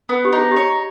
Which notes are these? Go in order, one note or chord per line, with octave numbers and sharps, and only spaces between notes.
B3
G4
D#4
G#4
G4 C#5